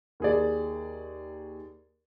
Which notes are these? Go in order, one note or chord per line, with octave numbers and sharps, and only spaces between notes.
D#2 G#4 D5